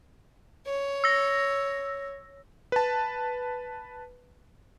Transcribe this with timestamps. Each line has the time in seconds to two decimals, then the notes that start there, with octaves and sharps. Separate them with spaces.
0.66 C#5
1.04 E6 A#6
2.72 B4 A5